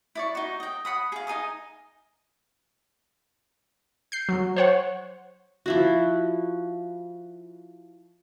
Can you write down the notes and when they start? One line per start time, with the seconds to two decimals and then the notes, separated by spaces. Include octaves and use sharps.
0.15 E4 D5 C#6
0.35 D#4 F#4
0.60 D#5 G5
0.85 F#5 B5 D#6
1.12 G#4 F5
1.27 D#4 G#5 A#5 D#6
4.12 G6 C7
4.29 F#3
4.56 C5 C#5 F#5
5.66 F3 E4 F#4